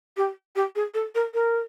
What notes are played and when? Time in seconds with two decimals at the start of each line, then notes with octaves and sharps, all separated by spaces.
0.17 G4
0.56 G4
0.76 G#4
0.94 A4
1.15 A#4
1.34 A#4